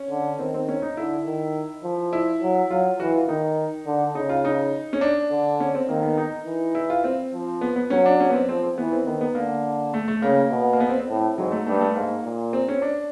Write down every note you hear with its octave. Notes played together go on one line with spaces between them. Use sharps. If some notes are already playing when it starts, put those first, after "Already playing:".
Already playing: C#4
D3
D#3 C4
C4
C#4
D#4
D3 E4
D#3
F3
E4
F#3
F#3 F4
E3 F#4
F4
D#3 D#4
D3
C#3 D#4
F4
D#4
C#4
D4
D3
C#4
C4
D#3 A#3
B3
D#4
E3
E4
F4
C4
F3
B3
B3
F#3 C#4
D4
C#4
B3
C4
F3 C4
C4
E3 B3
C4
D#3 B3
B3
D3 A#3
A3
A3
C#3 A#3
B2
A#3
B3
C4
C4
A2
G#2 F#3
A3
G2 A3
A3
G#2 A#3
A#2
C4
C#4
D4